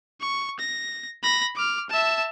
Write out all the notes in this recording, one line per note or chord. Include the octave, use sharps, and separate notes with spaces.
C#6
A#6
B5 A#6
D6 F6
E5 A5